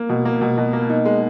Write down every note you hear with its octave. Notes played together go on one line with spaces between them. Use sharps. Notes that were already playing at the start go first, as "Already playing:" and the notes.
Already playing: A#3
B2
A#3
B2
B2
A#3
D#4
G#3